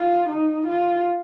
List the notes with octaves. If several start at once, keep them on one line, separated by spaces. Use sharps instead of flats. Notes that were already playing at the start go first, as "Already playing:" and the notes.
Already playing: F4
D#4
F4